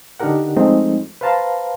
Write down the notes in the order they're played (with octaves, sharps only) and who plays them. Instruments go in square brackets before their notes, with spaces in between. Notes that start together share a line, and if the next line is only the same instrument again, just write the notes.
[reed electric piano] D3 D4 D#4 G4 A#4 F#5
F3 G#3 A3 C4 D#4
B4 C5 F5 A5 A#5 C6